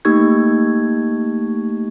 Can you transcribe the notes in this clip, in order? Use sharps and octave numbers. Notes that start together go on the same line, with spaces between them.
A3 A#3 D#4 G4 C#6 G#6